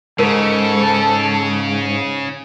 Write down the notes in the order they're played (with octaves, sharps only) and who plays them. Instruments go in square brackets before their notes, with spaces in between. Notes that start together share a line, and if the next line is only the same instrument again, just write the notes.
[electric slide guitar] G#2 [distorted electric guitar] C#3 [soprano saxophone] A4 [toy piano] A#4